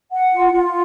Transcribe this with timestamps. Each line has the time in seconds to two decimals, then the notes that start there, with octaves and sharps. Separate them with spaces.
0.12 F#5
0.33 F4
0.52 F4